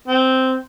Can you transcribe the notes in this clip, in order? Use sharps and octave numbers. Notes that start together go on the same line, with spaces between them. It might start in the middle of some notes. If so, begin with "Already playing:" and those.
C4